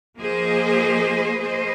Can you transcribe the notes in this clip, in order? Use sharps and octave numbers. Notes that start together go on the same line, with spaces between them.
F3 A#3 G#4 C5 D#5
A#3 G#4 C5 D#5